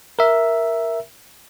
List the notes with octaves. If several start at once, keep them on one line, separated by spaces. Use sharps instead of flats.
A#4 E5